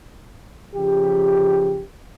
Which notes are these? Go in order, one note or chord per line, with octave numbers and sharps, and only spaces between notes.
C#3 F3 G4